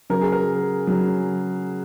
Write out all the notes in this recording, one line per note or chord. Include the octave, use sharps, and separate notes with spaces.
C#3 F#3 A#4
G#4
A#4
C#3 F#3